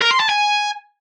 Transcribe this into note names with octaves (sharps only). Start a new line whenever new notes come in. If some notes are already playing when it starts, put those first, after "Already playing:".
A#4
C6
A5
G#5